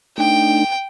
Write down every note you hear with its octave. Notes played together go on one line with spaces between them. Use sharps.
A3 D4 D#4 G5